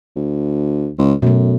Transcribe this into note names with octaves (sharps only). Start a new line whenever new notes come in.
D2
C#2
F#2 B2 A3